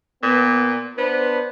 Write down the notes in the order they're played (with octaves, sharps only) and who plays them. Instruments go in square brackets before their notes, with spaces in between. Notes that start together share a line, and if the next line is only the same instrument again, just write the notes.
[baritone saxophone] A#2 [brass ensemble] B3
[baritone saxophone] B3 [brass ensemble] D4 B4 C5